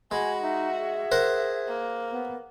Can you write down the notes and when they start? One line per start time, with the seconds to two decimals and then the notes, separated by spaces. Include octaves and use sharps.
0.11 G#3 F#4 G#5 B5
0.43 D#4 E5
0.78 G#4
1.12 A#4 C5 F#5
1.67 A#3
2.12 B3